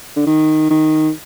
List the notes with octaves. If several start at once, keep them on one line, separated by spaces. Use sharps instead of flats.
D3
D#3
D#3